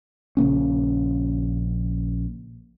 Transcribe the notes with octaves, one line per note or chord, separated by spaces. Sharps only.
A#1 C#3 A#3 C#4